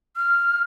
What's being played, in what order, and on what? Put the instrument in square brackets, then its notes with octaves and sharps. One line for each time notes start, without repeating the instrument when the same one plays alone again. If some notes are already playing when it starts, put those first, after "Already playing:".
[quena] F6